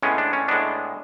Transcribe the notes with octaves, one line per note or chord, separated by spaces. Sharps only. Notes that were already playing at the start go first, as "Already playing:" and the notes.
A2 G#3 B3 C#4
D4
C#4
A2 G#3 B3 D4